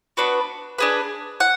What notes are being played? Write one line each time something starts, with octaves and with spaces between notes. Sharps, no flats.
B3 D4 F#4 B4
D4 G#4 B4
F#5